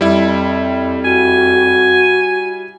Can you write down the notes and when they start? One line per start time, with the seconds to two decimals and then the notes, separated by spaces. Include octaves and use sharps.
0.01 F2 G3 E4
1.04 F#4 G#5